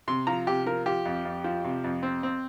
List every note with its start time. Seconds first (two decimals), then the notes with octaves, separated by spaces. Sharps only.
0.08 C3 C6
0.27 F3 A#5
0.47 C3 G4
0.66 F3 A#4
0.86 F3 G4
1.05 F2
1.25 F2
1.44 F3
1.64 C3
1.84 F2
2.03 C4
2.23 C4